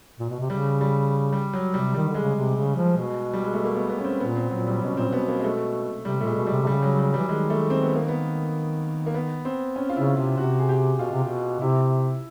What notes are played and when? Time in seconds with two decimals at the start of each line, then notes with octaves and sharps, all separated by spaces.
0.19 A#2
0.29 B2
0.40 C3
0.50 C#3 G3
0.81 G3
1.33 G3
1.53 F#3
1.73 C3 G3
1.94 D#3 G3
2.09 D3
2.15 G#3
2.21 C#3
2.35 C3
2.56 C#3
2.76 F3
2.97 B2
3.34 G3
3.44 G#3
3.54 A3
3.64 A#3
3.75 B3
3.89 B3
3.98 C#4
4.04 C4
4.20 A#2 B3
4.36 C4
4.51 A#2 F#3
4.67 G3
4.82 B2 C#4
4.96 A#2 C4
5.09 B2 B3
5.28 A#3
5.40 G#3
5.44 A3
6.05 C3 G3
6.21 A#2 A3
6.26 G#3
6.36 B2
6.47 G3
6.52 C3
6.63 C3
6.67 C#3 G3
6.83 F#3
6.98 G3
7.14 E3 G3
7.28 D#3 G#3
7.50 A3
7.70 C4
7.83 B3
7.96 A#3
8.08 B3
9.06 A#3
9.14 B3
9.45 C4
9.76 C#4
9.89 F4
9.96 C#3 E4
10.17 C3 F4
10.38 C3 F#4
10.59 G#4
10.69 G4
10.99 B2 F4
11.11 C3
11.24 B2
11.61 C3 E4